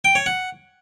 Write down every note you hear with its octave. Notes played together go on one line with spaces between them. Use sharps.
G5
C#5
F#5